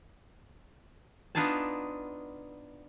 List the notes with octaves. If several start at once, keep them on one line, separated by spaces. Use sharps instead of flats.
B3 D4 D#4 F4 G#5 A5